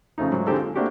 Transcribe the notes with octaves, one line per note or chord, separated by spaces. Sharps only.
C#3 F3 A3 D#4
G#2 F#3
D3 G#3 C4 D#4 G4 A4
F4
A3 A#3 C4 D4 F#4 G4